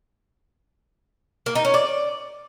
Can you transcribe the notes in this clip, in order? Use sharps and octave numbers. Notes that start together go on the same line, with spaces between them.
A#3
D#4
C#4
D5